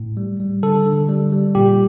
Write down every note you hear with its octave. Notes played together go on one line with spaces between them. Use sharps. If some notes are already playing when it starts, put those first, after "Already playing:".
Already playing: A2
G3
G3
D3 A4
D3
G3
G3
A#2 G4